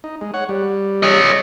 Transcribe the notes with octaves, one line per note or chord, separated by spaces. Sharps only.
D#4
G#3
C#5 F#5
G3
C#5 D#5